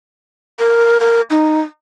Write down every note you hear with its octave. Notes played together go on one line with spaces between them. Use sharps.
A#4
A#4
D#4